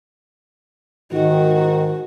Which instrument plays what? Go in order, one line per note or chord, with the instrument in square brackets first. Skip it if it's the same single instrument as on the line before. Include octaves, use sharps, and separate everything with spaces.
[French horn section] G#2 D#3 [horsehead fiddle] F#4